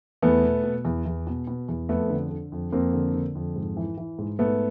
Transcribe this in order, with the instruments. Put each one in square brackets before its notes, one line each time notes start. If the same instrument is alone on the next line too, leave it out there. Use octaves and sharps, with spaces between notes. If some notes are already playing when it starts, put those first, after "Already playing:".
[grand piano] E2 A3 B3
B2
B2
E2
E2
B2
B2
E2
F2 A3 B3
D3
D3
F2
F2 A#3 C4
D3
D3
F2
G#2
E3
E3
G#2
G#2 A3 B3